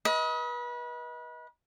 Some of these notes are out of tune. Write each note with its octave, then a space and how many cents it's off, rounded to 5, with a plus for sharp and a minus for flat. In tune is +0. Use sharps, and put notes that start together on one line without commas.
B4 -30 D#5 +30